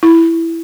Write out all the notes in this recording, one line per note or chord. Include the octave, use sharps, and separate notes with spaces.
E4